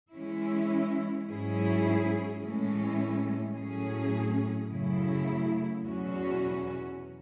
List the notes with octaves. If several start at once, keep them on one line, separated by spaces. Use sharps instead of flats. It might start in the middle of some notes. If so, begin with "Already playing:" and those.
E3 G#3 C#4 E4
G#2 F#3 C#4 E4 G#4
A2 E3 G#3 C#4
A2 F#3 C#4 G#4
F#2 C#3 F#3 A3 E4
E2 B2 F#3 C#4 F#4